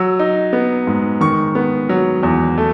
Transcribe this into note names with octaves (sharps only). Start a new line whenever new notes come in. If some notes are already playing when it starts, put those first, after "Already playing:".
Already playing: F#3 E6
D#4
B3
G#2
D#3 C#6
B3
F#3
E2
A3